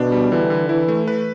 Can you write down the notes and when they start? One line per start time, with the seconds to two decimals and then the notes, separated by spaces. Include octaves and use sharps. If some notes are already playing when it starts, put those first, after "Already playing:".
Already playing: B2 D4
0.12 G3
0.32 D3 E3
0.50 D3
0.69 E3 E4
0.88 A3
1.08 B4